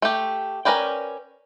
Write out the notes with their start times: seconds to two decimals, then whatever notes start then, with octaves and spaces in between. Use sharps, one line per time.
0.02 A3 G4
0.65 C#4 A#4 B4 D5 G5